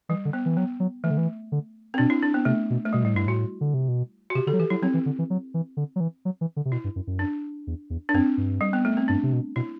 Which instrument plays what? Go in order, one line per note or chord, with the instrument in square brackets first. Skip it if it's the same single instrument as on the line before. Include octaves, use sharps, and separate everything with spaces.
[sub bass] E3 [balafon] G3
[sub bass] D3
[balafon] B3
[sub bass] E3
[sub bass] F#3 [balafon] B3
[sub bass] F#3
[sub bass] E3 [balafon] A3
[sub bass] D3
E3
D3
[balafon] C4
[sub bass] B2 [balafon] D4
[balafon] E4
D4
B3
[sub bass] C3 [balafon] A3
[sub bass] B2
[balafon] A3
[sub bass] B2 [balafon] G3
[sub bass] A2 [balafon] G3
[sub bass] G2 [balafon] E4
[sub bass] A2 [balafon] F#4
[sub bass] D3
C3
B2
[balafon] F#4
[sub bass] C3 [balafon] G4
[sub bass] D3 [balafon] A4
[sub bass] F#3
[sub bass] E3 [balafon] G4
[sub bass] F#3 [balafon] E4
[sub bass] F#3 [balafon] C4
[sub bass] E3
D3
E3
F#3
E3
D3
F#3
E3
F#3
E3
D3
C3
[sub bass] B2 [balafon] E4
[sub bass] G2
F#2
F#2
[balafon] D4
[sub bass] E2
E2
[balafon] D4
[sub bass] F#2 [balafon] C4
[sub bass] G2
[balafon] G3
B3
A3
C4
[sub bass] G2 [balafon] D4
[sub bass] C3
B2
[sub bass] B2 [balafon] E4